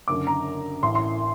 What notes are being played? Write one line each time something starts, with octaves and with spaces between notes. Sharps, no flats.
F#1 F#2 D3 D6
A#5
A1 A2 C6
C6